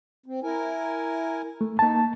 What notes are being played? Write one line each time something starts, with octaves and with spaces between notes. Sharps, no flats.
C4
E4 A#4 G#5
A3
A#3 D#4 A5